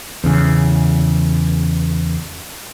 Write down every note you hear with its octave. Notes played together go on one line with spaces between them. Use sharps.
E2 C#3